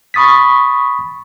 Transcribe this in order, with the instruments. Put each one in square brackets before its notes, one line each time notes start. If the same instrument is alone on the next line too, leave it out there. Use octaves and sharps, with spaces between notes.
[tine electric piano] B5 C#6 D#6 A6 B6